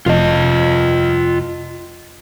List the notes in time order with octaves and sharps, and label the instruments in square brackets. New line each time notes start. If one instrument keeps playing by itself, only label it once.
[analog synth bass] F1 [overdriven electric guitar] F4 D#5